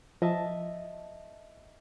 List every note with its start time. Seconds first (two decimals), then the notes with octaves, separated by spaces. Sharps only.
0.22 F3 D#5 E5 A5